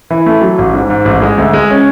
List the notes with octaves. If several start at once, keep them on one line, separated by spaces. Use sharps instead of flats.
E3
A3
F#3
A1
G#2
G#2
A1
G#3
D2
G#3
C#4